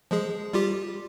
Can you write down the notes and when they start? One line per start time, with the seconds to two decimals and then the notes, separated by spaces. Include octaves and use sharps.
0.11 F3 G#3 G#4
0.53 G3 F4 G4